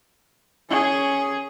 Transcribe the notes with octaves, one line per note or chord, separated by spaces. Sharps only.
C#4 G#4